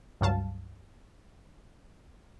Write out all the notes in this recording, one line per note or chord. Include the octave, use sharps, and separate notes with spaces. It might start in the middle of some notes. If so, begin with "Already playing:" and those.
C#2 G2 F#3 F5 A5